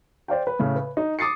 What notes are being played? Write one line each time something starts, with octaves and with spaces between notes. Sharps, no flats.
C5 D5 F5 G5
B4
A2 C#3
B4
D#4
D6 D#6 A6 C7 C#7